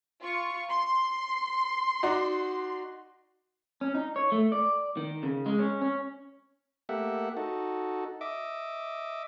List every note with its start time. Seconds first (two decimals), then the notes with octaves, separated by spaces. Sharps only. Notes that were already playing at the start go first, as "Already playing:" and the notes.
0.22 F4 C#6
0.69 C6
2.03 D#4 F#4 D5
3.81 C#4
3.95 D#4
4.16 C#5
4.32 A3
4.52 D5
4.97 D#3
5.23 C#3
5.46 G#3
5.59 C#4
5.82 C#4
6.89 A3 A#3 G4 E5 F#5
7.37 D#4 F#4 A4
8.21 D#5 E5 D6